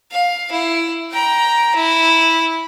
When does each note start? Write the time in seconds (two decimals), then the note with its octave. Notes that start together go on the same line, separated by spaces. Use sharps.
0.12 F5
0.51 E4
1.11 G5 A#5
1.75 E4